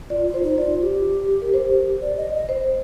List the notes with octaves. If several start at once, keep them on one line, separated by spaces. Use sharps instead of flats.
F4 D5
F4
C5
D#4
F4 D5
G4
A#4
C5
D5
D#5
D#5
C5